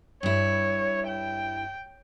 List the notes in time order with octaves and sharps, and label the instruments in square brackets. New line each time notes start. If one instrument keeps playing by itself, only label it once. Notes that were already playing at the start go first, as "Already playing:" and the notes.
[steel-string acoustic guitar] G2 E4 [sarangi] C#5
[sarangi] G5